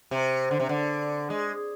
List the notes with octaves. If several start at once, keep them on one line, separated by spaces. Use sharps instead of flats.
C3
D3
C3
D3
G#3